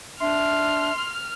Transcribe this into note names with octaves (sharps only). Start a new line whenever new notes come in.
D4 E5 C6 F6